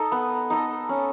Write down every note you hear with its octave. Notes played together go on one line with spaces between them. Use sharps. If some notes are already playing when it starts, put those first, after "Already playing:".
Already playing: D#4 A4 D#5
B3
D#4 A4 D#5
C#4